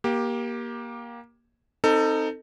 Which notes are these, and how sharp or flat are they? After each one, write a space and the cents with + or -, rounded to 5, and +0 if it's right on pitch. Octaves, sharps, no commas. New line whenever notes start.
A#3 +20 G4 +0
C4 +0 D#4 +0 A4 +25